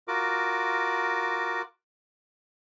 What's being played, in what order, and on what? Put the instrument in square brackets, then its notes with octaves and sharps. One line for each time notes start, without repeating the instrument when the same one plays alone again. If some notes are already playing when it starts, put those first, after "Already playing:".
[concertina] F4 F#4 A#4 D6